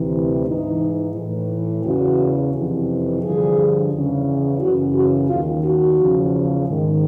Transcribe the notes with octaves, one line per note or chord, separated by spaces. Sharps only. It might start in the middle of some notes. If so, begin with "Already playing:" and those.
Already playing: D2 C3 E3
G#2 E3 D#4
A2 E3
E2 C#3 E3 F#4
F2 C3 E3
G2 D3 F3 G#4
E2 C#3 E3
F#2 C#3 E3 F#4
F#4
D#2 D#3 F4
F#4
E2 C#3 F3
G#2 D#3